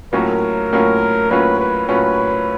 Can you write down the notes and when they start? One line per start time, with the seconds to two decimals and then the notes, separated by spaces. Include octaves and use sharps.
0.13 A2 F#3 A#3 C#4 F4 A#4
0.73 A2 F#3 A#3 C#4 F4
1.30 A2 F#3 A#3 C#4 F4 B4
1.60 B4
1.88 A2 F#3 A#3 C#4 F4 B4